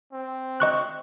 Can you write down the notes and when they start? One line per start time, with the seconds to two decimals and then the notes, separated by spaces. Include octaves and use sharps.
0.13 C4
0.60 D#5 C#6 F#6